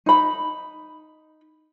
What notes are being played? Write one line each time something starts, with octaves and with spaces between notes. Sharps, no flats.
D#4 B5